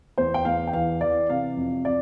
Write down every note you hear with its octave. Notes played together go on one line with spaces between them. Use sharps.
E2 C5
G5
E2 F5
G5
E3 F5
E3 D5
C3 F5
F2
C3 D5